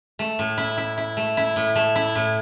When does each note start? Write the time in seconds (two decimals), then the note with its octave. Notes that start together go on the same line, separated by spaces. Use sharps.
0.19 A3
0.39 A2
0.58 E4
0.78 E4
0.98 E4
1.17 A3
1.37 E4
1.56 A2
1.76 A3
1.96 E4
2.15 A2